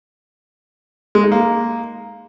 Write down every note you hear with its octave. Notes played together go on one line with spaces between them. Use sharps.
G#3
D#4
A#3